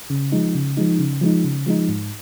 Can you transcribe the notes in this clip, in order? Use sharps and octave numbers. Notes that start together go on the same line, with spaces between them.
C#3
F3 G#3 D#4
C#3
F3 G#3 D#4
C#3
F3 G#3 D#4
C#3
F3 G#3 D#4
G#2